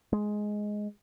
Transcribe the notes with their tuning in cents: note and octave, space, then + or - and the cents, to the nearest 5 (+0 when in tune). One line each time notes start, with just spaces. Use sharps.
G#3 +5